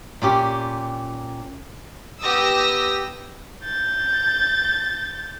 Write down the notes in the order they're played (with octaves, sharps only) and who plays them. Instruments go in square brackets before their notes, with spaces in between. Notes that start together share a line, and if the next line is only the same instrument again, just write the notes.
[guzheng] A#2 C#4 G4
[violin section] B3 G4 D#6 E6 A#6
[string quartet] G6 A6